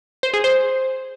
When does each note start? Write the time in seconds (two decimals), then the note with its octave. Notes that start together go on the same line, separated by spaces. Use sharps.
0.23 C5
0.34 G#4
0.44 C5